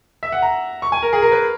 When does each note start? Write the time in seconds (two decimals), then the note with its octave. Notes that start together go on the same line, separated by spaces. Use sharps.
0.23 E5
0.32 F#5
0.42 A#5
0.82 C#6
0.92 G#5
1.02 A#4
1.13 G#4
1.22 A#4
1.32 B4